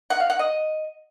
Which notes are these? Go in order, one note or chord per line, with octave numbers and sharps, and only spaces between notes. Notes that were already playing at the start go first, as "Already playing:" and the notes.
F#5
F5
F#5
D#5